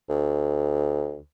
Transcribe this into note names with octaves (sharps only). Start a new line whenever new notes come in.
D2